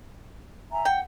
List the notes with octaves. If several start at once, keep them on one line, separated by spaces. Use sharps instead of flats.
E5 G#5 A#5
F#5 G5